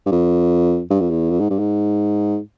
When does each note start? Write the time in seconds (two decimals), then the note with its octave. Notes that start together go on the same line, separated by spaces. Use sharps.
0.06 G2
0.12 F2
0.91 G2
1.01 F2
1.10 E2
1.30 F2
1.40 G#2
1.50 G2
1.59 G#2